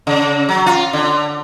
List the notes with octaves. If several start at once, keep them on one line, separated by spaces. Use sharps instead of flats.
C#3
F#3
F4
D3